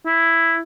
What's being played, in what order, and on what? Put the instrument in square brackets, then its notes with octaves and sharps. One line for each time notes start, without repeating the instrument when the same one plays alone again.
[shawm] E4